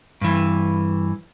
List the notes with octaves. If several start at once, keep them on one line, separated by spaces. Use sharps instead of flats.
G2 E3